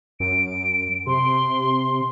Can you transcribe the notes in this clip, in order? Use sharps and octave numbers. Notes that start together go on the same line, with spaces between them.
F#2 D7
C3 C6